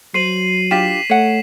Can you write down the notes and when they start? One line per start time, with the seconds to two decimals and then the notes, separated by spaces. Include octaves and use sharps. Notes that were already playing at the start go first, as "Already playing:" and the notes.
0.14 F#3 C5 C7 D#7 F#7
0.71 D4 F4 G4 B6 E7
1.10 A3 C#5 F#5